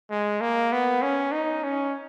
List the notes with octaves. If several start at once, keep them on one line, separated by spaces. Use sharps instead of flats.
G#3
A#3
B3
C#4
D#4
C#4